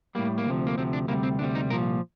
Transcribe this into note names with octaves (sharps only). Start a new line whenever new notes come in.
A2 G3 A#3
A#3
D2 C3 F3
A#3
D2 C3 F3 C4
D4
D2 C3 G3 A#3
C4
D2 C3 G3 D4
D#4
C2 A#2 F3 A#4